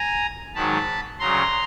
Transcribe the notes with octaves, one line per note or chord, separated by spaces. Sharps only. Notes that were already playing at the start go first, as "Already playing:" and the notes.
Already playing: G#5 A#5
G#2 D#3 F#3 A5 B5
D2 C#3 F#3 A#5 C6